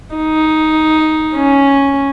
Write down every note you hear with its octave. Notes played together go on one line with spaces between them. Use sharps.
D#4
C#4